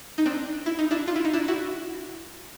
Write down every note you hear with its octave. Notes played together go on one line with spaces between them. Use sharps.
D#4
C4 D4
E4
D#4
D4 E4
F4
E4
D#4
D4 E4
E4 F#4